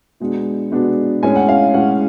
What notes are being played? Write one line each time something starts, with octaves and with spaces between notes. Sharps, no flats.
B2 G#3 B3 D4
B2 G#3 B3 D4
A2 G#3 C#4 G#5
F#5
F5
A2 G#3 C#4 F#5